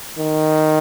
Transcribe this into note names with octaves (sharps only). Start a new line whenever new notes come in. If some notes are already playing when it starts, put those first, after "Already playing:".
D#3